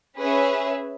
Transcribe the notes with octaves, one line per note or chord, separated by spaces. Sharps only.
C#4 G#4 B4 E5